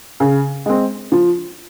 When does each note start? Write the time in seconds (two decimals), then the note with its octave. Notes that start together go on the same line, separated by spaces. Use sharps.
0.20 C#3
0.66 G#3 C4
1.12 F3